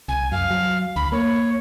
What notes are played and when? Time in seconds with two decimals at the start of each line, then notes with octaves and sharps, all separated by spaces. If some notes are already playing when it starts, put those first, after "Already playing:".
0.08 C2 G#5
0.32 F#2 F5
0.51 F#3
0.96 D2 B5
1.12 A#3 C#5